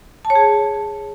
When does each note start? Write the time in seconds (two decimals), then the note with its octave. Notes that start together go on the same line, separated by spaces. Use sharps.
0.25 A5
0.30 C#5
0.35 G#4